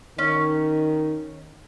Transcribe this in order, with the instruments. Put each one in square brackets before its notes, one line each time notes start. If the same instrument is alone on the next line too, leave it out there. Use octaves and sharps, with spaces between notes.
[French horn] D#3 [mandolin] C#4